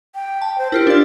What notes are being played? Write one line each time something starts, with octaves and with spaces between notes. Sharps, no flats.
G5
A5
C5
E4 F4 G4 A#4
D4 F4 D5